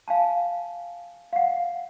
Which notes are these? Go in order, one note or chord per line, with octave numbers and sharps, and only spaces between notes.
F5 G#5 A5
F5 F#5